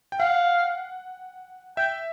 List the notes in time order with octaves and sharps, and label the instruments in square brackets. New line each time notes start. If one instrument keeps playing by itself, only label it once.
[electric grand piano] G5
[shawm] F5 [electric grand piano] F#5
[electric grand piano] E5 [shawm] G5